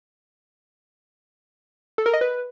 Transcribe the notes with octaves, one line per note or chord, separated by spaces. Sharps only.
A4
A#4
D#5
B4